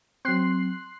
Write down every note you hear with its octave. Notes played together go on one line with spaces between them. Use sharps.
F#3 C4 C6 F#6 C7